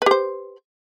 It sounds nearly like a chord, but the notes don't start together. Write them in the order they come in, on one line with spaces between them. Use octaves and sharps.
B4 G4 C5